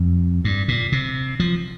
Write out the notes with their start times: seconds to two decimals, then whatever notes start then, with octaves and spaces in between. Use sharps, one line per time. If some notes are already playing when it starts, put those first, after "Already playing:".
Already playing: F2
0.45 G2
0.68 A#2
0.92 C3
1.40 F3